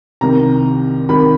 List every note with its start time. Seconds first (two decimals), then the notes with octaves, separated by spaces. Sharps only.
0.21 C2 C3 D#3 A#5
1.09 C2 C3 D#3 B5